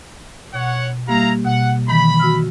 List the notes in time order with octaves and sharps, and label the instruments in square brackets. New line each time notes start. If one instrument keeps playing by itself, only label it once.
[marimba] B2 [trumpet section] C#5 F#5
[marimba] G3 A#3 G4 [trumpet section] E4 F5 A#5
[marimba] B2 [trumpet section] F#5
[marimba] D#3 E3 [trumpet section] B5
[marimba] F#4 E6 F6